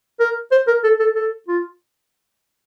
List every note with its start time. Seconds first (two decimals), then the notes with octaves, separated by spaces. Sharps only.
0.20 A#4
0.51 C5
0.68 A#4
0.84 A4
1.00 A4
1.15 A4
1.48 F4